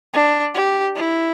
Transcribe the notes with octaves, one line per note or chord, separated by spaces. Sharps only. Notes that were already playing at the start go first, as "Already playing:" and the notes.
D4
G4
E4